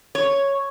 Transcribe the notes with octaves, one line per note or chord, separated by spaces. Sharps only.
C#5